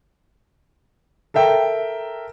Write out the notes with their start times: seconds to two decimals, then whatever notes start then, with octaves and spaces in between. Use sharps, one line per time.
1.34 A4 A#4 E5 G5